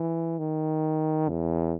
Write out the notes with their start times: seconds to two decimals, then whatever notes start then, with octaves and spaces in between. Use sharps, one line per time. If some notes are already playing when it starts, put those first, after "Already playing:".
Already playing: E3
0.39 D#3
1.29 E2